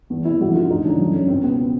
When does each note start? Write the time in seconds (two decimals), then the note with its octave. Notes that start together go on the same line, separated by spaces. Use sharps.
0.10 E2
0.25 C3 E3 E4
0.41 F2 F#4
0.55 D3 F4
0.70 D2 D#4
0.84 C#3 E3 D4
0.99 F#2 C#4
1.14 D3 C#4
1.28 C#2 C4
1.44 B2 B3